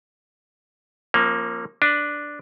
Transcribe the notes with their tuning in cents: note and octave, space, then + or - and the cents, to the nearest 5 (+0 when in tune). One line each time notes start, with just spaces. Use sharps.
F3 +0 A#3 +0 C#4 -45
D4 +0 B4 +0